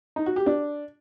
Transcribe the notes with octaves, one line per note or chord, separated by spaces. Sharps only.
D#4
F#4
G4
D4